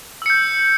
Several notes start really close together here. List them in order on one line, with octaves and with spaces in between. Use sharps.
E6 C#7 G6